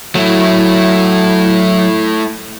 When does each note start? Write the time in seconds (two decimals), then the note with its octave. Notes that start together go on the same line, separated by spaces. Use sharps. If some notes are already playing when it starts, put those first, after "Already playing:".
0.15 F#3 A3 E4